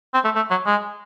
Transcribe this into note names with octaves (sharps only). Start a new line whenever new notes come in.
C4
A3
A3
F#3
G#3